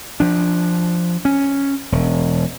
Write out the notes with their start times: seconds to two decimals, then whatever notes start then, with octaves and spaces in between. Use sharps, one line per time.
0.20 F3 D4
1.25 C#4
1.92 E1